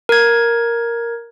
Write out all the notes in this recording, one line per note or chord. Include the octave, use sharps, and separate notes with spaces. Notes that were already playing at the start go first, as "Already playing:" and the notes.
A#4 G#6